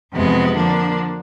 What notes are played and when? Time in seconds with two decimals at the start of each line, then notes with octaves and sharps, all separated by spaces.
0.13 F2 C3 E3 G#3 B3
0.55 D3 F3 A#3 D4